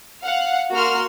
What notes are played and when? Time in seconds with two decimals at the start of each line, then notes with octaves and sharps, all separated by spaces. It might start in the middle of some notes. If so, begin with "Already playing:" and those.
0.22 F5 F#5
0.72 A#3 F#4 C6 F6